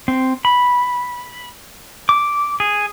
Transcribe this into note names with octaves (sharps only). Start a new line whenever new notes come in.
C4
B5
D6
G#4